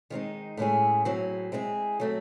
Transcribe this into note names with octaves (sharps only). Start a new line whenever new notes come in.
D#3 G#3 C4 D#4
A2 G#3 C#4 E4 G#4
A2 F#3 C4 E4 G#4
G#3 C4 E4 G#4
F#3 A3 C4